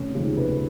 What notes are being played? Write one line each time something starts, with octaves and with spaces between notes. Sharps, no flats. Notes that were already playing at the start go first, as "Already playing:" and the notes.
Already playing: F1 C#4
D#2 C#3 F3 G#3
F1 B4